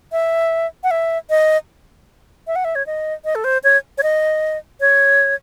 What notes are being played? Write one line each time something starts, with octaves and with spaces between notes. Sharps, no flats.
E5
F#5
E5
D#5
E5
F#5
E5
C#5
D#5
D#5
A4
C5
C#5
C#5
D#5
C#5